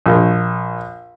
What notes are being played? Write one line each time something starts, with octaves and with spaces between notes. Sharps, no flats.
A#1